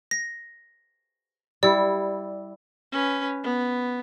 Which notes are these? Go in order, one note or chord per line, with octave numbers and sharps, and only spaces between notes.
A#6
G3 E4 D5
C#4 B4
B3